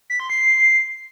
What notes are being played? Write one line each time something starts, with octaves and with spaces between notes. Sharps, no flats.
B6
C6
C7